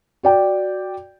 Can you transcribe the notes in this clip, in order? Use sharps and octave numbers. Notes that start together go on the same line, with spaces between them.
F#4 D5 G5